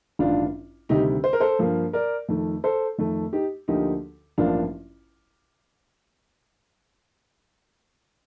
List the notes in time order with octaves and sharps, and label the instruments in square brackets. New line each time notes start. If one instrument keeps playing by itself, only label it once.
[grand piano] A1 G2 D#3 D4 F4
D2 C3 D#3 G3 D#4 G4
C5
A#4
A4 C5
G2 F3 A#3
A#4 D5
F2 D#3 A3
A4 C5
F2 D#3 A3
D#4 G4
D2 D3 F3 A#3 D#4 G4
A1 G2 F3 A#3 D4 F4